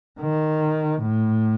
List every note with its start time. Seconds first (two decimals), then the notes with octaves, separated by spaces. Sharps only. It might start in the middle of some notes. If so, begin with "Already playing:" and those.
0.20 D#3
1.02 A2